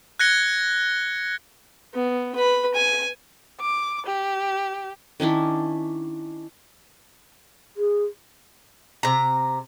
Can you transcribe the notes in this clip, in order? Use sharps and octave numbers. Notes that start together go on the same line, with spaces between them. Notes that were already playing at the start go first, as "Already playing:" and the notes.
F#6 G#6 A#6 C#7 G7
B3
B4 B5
G#5
D6
G4
D#3 C#4 D4 E4
G#4
C3 A#5